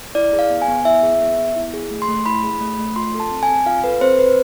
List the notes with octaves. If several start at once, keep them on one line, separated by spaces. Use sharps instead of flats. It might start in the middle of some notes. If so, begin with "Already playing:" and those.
E4 D5
G#4
F5
B3
G#5
B3
E4 E5
G#4
B3
B3
E4
G#4
A3
C6
A3
E4 B5
G#4
A3
A3
F4 C6
A4
A5
C4
G#5
C4
F4 F5
A4 B4
C4 C5
C4 B4